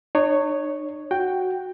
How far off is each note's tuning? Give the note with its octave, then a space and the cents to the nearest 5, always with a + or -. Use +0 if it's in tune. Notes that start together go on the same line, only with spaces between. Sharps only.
D#4 -45 C#5 +0
F#4 +0 G5 +0